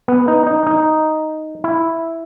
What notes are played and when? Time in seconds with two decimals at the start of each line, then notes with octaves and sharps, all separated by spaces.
0.08 B3
0.28 D#4
0.47 D#4
0.67 D#4
1.64 E4